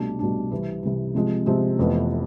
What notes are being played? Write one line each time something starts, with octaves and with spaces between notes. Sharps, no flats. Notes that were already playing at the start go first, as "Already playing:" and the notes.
Already playing: C2 B2 A3 D4
C2 B2 A3 D4
C2 C3 E3
C2 C3 E3
C3 F3 G#3 C4
C3 F3 G#3 C4
F1 F2 E3 B3